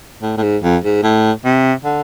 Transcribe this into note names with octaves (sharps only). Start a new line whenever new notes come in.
A2
A2
G#2
F2
G#2
A2
C3
D3